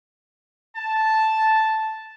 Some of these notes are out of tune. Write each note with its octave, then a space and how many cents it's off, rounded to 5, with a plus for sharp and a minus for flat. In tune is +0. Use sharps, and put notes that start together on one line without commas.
A5 -5